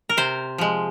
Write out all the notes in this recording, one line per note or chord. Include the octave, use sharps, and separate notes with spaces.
A#4
C3 C5
F3 G#3